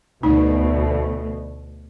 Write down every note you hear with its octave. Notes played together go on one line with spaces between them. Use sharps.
D2 B2 A3 D#4